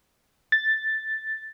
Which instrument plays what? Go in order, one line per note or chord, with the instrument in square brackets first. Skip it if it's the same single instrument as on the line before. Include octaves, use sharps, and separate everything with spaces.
[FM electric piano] A6